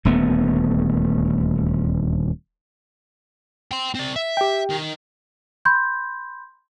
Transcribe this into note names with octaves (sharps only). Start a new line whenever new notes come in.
D#1 D2 A3 B3
G5 C6
C4 D5
E5
G4 G5
D#3
B5 C6 G6